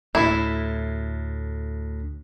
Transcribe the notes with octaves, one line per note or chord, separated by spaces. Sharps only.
D2 A2 E4